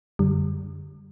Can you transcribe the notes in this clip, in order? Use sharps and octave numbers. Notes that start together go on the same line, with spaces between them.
F#2 D3 G3